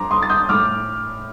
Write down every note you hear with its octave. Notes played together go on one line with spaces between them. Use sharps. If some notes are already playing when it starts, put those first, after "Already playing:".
Already playing: F2 A#5 C6 D6
C6 D#6
A6
D#6 G6
A2 D6 F6